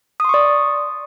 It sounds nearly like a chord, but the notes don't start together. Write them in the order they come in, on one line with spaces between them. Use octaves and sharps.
D#6 C6 C#6 D5